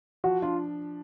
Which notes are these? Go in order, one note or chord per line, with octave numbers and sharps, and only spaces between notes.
F3 F#4
D4 F4